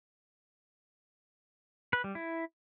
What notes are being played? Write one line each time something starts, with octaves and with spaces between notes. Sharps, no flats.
B4
G3
E4